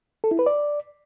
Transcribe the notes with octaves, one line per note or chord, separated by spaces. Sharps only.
A4
E4
B4
D5